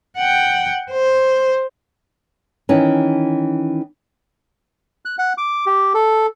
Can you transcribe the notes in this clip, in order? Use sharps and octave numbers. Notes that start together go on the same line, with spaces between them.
F#5 G5
C5
D#3 E3 C#4
F#6
F#5
D6
G4
A4